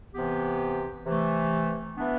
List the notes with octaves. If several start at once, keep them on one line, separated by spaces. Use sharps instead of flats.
C3 E3 B3 G4
C3 E3 A3
E3 B3 D4